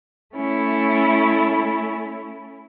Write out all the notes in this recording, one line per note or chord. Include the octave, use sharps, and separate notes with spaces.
A3 C#4 E4